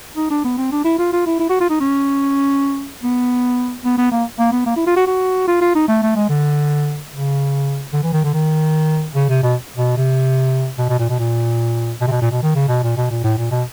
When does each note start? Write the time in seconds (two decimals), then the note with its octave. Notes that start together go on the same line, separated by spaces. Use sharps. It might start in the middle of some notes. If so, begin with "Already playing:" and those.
0.17 D#4
0.31 D4
0.44 B3
0.58 C4
0.72 D4
0.85 E4
0.99 F4
1.13 F4
1.26 E4
1.40 E4
1.49 F#4
1.61 F4
1.70 D#4
1.80 C#4
3.03 B3
3.85 B3
3.98 B3
4.12 A#3
4.39 A#3
4.52 B3
4.66 A#3
4.76 E4
4.87 F4
4.96 F#4
5.07 F#4
5.48 F4
5.61 F4
5.75 D#4
5.88 A3
6.02 A3
6.16 G#3
6.30 D3
7.12 C#3
7.93 D3
8.03 E3
8.13 D#3
8.24 D3
8.34 D#3
9.15 C#3
9.29 C3
9.43 B2
9.77 B2
9.97 C3
10.78 B2
10.89 B2
10.99 A#2
11.10 B2
11.19 A#2
12.01 B2
12.07 C3
12.11 B2
12.22 A#2
12.32 B2
12.43 D#3
12.56 C#3
12.69 B2
12.83 A#2
12.97 B2
13.10 A#2
13.24 A2
13.38 A#2
13.51 B2